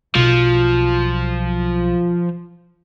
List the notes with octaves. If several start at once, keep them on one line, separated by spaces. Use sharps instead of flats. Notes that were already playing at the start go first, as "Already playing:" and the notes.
B1 F3